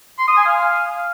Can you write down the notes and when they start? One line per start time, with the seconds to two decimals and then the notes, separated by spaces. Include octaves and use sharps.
0.18 C6
0.28 D#6
0.37 G#5
0.46 F5